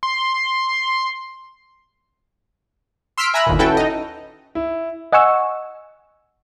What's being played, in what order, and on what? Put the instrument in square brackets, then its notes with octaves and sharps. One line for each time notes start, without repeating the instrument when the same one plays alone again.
[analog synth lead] C6
[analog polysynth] C6 E6 F6 B6 C7 D7
E5 G#5 A#5 B5 E6 F#6
G1 D#2 A#2
C#4 E4 F#4 A4 B4 G5
D#4 D#5
[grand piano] E4
[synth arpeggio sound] D#5 F#5 G#5 C#6 E6